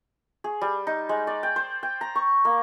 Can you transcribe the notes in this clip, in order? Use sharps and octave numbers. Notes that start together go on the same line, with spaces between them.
G#4
G3
D#4
G#3
D5
G5
C5
G5
A#5
C#6
A#3